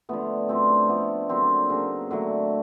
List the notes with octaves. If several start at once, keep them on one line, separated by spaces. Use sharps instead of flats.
D3 F3 A3 B3
F#2 D3 F3 A3 C4
D3 F3 A3 B3
D3 F#3 A#3 C4
C#3 F#3 A#3
D3 F#3 A3